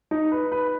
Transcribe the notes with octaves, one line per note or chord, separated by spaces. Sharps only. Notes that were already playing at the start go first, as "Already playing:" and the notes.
D#4
B4
B4